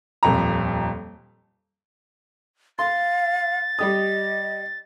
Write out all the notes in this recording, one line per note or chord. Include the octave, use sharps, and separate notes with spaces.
D#1 F2 A#5
F5 C6 A6
G3 G4 D#5 D#6